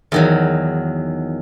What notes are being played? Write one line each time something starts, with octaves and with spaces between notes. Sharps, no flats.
E2 D#3 F#3